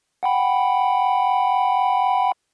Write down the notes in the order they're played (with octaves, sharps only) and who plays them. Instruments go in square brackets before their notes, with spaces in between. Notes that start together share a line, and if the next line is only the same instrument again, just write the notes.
[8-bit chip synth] F#5 G5 B5